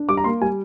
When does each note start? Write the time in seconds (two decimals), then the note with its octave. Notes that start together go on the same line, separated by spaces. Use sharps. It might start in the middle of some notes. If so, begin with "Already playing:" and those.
Already playing: D4
0.09 G3 D6
0.17 A#5
0.24 A#3 C6
0.42 G3 G#5